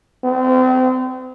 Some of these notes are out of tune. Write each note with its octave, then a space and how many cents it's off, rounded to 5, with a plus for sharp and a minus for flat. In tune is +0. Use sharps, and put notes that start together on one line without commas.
C4 -35